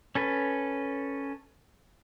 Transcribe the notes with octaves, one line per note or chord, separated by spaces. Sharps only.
C#4 A4 B4